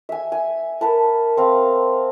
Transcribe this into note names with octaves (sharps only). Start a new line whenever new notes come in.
E5 G#5
G#5
A#4 B4 A5
C4 F5